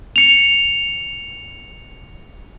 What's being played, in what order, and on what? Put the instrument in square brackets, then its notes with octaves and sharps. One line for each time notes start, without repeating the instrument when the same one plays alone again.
[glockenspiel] C#7 F7